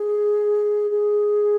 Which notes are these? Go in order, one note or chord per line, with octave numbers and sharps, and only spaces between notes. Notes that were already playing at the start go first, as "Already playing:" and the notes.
Already playing: G#4
G#4